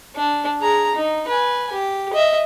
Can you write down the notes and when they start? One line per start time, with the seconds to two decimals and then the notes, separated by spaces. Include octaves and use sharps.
0.16 D4
0.60 G#4 A#5
0.95 D#4
1.28 B4 G#5
1.72 G4
2.13 D#5 E5